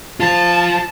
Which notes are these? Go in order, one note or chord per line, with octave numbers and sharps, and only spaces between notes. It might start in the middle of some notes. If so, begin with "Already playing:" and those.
F4 C5 A5